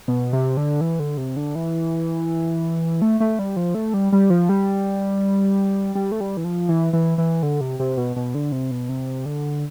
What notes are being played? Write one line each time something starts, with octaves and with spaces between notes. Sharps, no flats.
B2
C3
D3
E3
D3
C3
D3
E3
A3
A3
G3
F3
A3
G3
G3
F3
G3
G3
A3
G3
E3
F3
E3
E3
E3
D3
C3
C3
B2
B2
D3
C3
B2
C3
D3